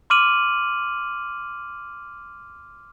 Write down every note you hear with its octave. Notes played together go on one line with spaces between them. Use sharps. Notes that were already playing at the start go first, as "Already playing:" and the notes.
C6 D6 F6 D#7 F#7